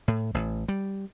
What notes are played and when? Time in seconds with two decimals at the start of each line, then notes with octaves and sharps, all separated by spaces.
0.08 A2
0.34 A1
0.68 G3